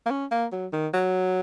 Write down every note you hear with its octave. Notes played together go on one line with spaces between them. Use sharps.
A#3
C#4
A#3
F#3
D#3
F#3